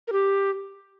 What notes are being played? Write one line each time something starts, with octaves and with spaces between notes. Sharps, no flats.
A#4
G4